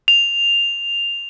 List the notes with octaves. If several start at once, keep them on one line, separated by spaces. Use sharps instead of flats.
F7